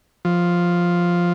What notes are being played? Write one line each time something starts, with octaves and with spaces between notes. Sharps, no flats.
F3